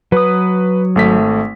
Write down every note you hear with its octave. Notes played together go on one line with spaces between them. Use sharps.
F#3 B4 D#6
G#1 A3 B6